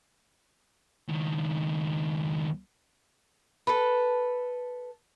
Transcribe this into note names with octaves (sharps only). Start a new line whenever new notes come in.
C#2 D#3
A4 B4